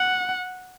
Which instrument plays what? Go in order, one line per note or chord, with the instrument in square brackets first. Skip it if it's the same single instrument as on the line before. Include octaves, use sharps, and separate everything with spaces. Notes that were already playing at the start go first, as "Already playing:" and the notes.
Already playing: [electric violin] F#5